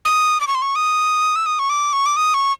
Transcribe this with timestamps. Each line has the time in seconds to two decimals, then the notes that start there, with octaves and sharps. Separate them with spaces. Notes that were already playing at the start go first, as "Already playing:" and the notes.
0.05 D#6
0.41 D6
0.47 C#6
0.55 C6
0.62 C#6
0.76 D#6
1.36 E6
1.46 D#6
1.59 C#6
1.70 D6
1.93 C#6
2.06 D6
2.16 D#6
2.34 C#6